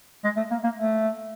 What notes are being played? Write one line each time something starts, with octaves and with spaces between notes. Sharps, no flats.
G#3
A3
A#3
A#3
A3